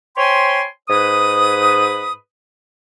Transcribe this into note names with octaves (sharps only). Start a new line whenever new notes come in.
C5 C#5 G5 G#5 B5 C6
G#2 B4 D#6